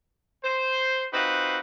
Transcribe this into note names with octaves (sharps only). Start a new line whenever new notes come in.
C5
C4 D#4 F4 F#4 B4